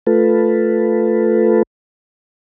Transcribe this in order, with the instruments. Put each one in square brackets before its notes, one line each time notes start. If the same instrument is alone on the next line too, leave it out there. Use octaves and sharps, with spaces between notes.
[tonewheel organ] A3 F4 A4 B4